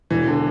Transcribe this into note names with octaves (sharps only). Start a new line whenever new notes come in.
E1 E3
D3